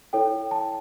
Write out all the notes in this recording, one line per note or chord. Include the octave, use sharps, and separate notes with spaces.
E4 A4 C#5 G5
A5